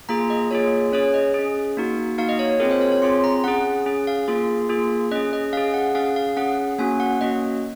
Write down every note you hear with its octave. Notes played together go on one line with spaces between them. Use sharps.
A#3 F4 G#4 A#5
D#5
A#3 F4 G#4 C#5
C#4 G#4 C#5
D#5
C#4 G#4
A#3 D#4 F#4
A#3 D#4 F#4 F5
D#5
C#5
C#5
C4 F4 G#4 A#4
C5
C#5
C#5
C4 F4 G#4 C6
A#5
C#4 G#4 F#5
C#4 G#4
F5
A#3 F4 G#4
A#3 F4 G#4
C#4 G#4 D#5
D#5
C#4 G#4 F5
F#5
C#4 G#4 F5
F5
C#4 G#4 F#5
A#3 C#4 F#4 G#5
F#5
A#3 C#4 F#4 D#5